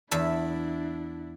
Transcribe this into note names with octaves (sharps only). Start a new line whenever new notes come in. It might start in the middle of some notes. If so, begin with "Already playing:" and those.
E2 D4 E4 E5 A5